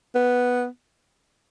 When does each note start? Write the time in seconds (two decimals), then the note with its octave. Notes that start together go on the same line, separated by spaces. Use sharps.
0.15 B3